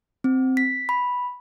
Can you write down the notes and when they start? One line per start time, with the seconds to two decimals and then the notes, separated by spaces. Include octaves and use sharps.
0.24 C4
0.57 B6
0.89 B5